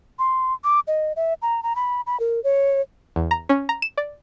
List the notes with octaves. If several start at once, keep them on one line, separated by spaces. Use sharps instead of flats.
C6
D6
D#5
E5
A#5
A#5
B5
B5
A#4
C#5
E2
A#5
C#4
A#5
E7
D5